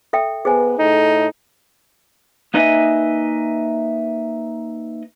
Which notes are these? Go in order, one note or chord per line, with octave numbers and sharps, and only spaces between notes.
A4 E5 G5
B3 G#4 B4 C5 G#5
A2 D#4 A4
A#3 D#4 B4 D#5 E5 G#5